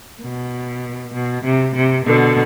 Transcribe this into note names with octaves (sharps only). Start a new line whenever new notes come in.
B2
B2
C3
C3
B2 D3